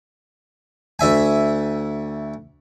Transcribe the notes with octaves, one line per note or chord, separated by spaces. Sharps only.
D2 E5 G#5